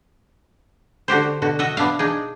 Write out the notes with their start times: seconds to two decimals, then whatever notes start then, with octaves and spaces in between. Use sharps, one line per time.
1.08 D3 F#4 G4 C5
1.42 B2 D3 F#4
1.59 F#4 D#5 E5 F#5
1.77 B3 D4 E5 F5
1.99 D4 D#4 G#4